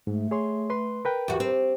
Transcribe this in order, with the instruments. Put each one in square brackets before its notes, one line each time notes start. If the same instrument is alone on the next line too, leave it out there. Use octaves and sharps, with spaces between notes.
[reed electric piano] G#2 [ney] A3
[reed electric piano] G#4 C#5 C6
B4 C6
A#4 B4 G5
[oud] E2 F#4 [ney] G4
[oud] C4